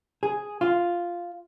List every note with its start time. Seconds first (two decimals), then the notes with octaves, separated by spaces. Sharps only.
0.23 G#4
0.61 F4